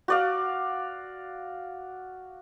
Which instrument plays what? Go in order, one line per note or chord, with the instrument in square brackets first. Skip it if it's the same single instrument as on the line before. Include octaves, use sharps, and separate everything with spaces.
[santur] F#4 D5 F5